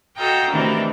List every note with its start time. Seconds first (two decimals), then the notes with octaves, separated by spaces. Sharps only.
0.17 F#4 A4 D#5 F5 G5 A#5
0.49 C3 D#3 E3 A3 D4